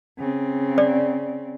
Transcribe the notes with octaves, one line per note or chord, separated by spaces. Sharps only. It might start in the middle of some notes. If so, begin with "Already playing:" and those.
C#3 C4
D5